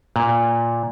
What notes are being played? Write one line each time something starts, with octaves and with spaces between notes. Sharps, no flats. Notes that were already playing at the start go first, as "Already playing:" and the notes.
A#2